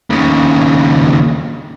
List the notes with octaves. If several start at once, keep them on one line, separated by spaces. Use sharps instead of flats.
D#2 C#3